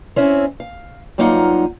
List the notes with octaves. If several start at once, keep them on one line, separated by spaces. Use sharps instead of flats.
C4 C#4 E4
F5
G2 F#3 A#3 D#4 F4 F#5